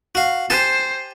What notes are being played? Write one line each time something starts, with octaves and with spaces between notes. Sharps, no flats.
F#4 F5
G4 C5 G#5 A5